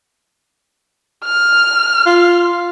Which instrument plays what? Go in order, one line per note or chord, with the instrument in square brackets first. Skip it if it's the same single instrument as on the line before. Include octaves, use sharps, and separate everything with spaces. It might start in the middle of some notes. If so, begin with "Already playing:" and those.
[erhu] F6
[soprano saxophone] F4